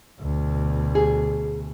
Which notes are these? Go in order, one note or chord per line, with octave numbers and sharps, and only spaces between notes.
D2 B2
G#4